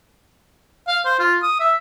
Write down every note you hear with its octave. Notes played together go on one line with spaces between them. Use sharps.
F5
C5
F4
D#6
E5